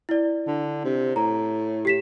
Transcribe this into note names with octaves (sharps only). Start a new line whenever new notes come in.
E4 D5
D3
C3
A2 A#5
G4 B6 E7